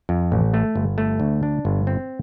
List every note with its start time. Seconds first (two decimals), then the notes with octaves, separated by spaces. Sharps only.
0.09 F2
0.32 A1
0.54 A3
0.75 G1
0.98 A3
1.20 D2
1.43 D4
1.65 G1
1.87 C4